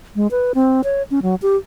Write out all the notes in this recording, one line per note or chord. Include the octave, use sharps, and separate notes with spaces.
G#3
B4
C4
C#5
C#4
F#3
G4